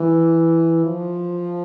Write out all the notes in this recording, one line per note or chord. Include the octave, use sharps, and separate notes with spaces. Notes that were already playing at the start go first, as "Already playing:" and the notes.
Already playing: E3
F3